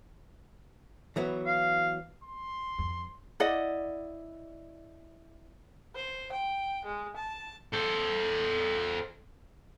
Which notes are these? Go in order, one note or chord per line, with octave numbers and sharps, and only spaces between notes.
E3 F#3 B3
F5
C6
F2
E4 D5 D#5 F#5
C5
G5
G#3
A5
A4 C5